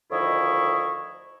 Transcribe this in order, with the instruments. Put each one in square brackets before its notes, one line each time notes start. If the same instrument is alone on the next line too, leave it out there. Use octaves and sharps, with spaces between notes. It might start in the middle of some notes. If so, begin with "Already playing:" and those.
[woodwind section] D2 D#3 F3 E4 D#5 C#6